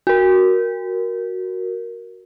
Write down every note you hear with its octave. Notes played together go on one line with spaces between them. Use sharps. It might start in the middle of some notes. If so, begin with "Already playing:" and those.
F#4 A#4